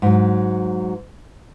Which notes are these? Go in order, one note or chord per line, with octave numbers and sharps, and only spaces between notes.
G#2 F#3